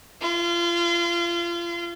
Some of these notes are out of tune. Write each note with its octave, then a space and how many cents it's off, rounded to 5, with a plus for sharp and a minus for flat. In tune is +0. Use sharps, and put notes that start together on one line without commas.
F4 -30